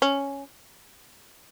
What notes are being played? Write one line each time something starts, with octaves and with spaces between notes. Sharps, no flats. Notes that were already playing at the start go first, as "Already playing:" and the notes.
C#4